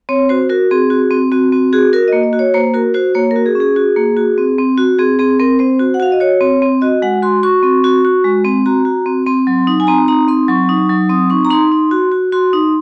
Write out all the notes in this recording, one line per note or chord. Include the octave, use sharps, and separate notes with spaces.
C4 C#5
F#4 C5
F#4 A#4
C4 G#4
F#4
C4
C4 F#4
C4 F#4
F#4 G#4
F#4 A#4
A#3 D#5
D#5
F#4
C#5
A#3 C5
F#4 A#4
F#4 C5
A#3 C#5
A#4
F#4
G#4
C#4
G#4
F#4
A#3
F#4
C4
C4
F#4
C4 G#4
C4 G#4
C4 A#4
C4 C5
F#4
F#5
F#4 F5
D#5
F#4 C#5
C4
C4
F#4 D#5
G#3 F#5
F#4 C6
F#4 C#6
C4
F#4
F#4
G#3
C4
F#4 A#5
F#4
C4
C4 C6
F#3
D#4
G#5
C4 A#5
D#4 A#5
C4 C6
F#3 C#6
D#4
F#3
C4 D#6
D#4 C#6
A#5
D#4 C6
D#4
F#4
F#4
F#4 C6
D#4